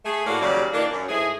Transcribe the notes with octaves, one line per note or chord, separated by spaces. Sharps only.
A3 G#4
A2 A3 A#3 F#4 D5 F5
D#2 C#3 F#3 G3 D5 F5
D#3 E3 A#3 D4
F#2
G#2 E3 A3 G#4